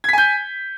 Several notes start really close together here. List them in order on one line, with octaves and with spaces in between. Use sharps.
G#6 B6 G#5 G6